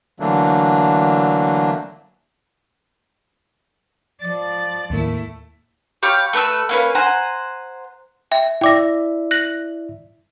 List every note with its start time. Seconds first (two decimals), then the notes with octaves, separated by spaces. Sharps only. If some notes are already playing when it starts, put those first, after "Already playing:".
0.20 D3 E3 F#3 A3 A#3 D4
4.21 F3 D5 A6
4.90 D#2 A2 A3 A#3 E4
6.03 G4 C#5 F5 B5
6.33 A3 B4 B5 E6
6.69 A#3 C#4 B4
6.95 C5 F#5 G#5 A#5
8.31 E5 G5
8.61 E4 D5 E5 G5 D6 A#6
9.31 F#6 A#6 F#7